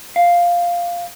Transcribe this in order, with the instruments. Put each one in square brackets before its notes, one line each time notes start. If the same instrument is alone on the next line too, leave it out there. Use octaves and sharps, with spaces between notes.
[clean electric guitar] F5